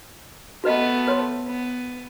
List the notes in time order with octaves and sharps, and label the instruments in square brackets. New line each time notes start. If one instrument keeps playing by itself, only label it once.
[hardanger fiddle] A3 B3 [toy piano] F#4 B4 D#5
[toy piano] B4 C#5 C6
[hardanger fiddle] B3